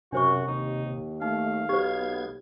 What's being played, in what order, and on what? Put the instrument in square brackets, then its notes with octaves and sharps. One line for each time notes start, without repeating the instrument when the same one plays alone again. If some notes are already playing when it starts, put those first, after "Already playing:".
[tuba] F#2 [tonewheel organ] C3 [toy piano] D4 C5 C#6 [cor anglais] F#4
[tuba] D#2 [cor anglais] D#4
[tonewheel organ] A3 [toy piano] D#4 [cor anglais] F5
[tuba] B1 [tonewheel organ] B3 G#6 [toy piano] G4 C5